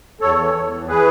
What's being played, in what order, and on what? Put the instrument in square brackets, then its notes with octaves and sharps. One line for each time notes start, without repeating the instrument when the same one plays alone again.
[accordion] E2 A4 C#5
E3
E2
E3
E3 G#4 B4